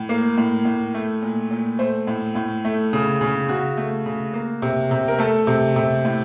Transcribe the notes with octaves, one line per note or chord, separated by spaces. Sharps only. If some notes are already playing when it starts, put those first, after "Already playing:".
Already playing: A2
A#3
A2
A2
A3
A#2
A#2
A3 C5
A2
A2
A3
C#3
C#3
C#3 F#4
A3
C#3
A#3
C3
C3
A#4
A3 A4
C3
C3
A2